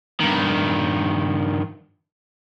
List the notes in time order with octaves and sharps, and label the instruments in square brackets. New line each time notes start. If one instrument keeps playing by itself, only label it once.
[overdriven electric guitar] G2 D#3